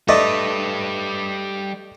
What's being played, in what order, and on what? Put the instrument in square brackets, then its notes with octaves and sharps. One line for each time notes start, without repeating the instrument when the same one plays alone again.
[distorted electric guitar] G3 B4 [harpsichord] A3 [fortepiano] D5 D#5